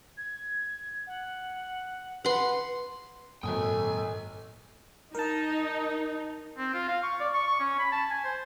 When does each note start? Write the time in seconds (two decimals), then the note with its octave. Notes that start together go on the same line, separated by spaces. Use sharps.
0.18 G#6
1.07 F#5
2.25 B4 F#5 C6
3.43 G#1 F#2 A#2 A4 G5 G#5 D#6
5.15 D#4 A#4 A5
6.58 C4
6.73 F4
6.88 F5
7.03 C#6
7.20 D5
7.34 C#6
7.48 C#6
7.59 C#4
7.78 B5
7.92 A5
8.10 G#5
8.24 C5